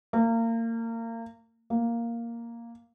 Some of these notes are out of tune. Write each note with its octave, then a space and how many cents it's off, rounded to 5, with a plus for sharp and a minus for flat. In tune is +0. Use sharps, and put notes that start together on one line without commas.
A#3 -30
A#3 +0